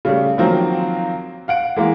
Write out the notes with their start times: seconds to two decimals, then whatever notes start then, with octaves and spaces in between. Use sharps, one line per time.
0.05 C#3 G3 A3
0.38 D#3 F3 F#3 A#3 C4
1.48 F5 F#5 D7
1.76 E3 G#3 A#3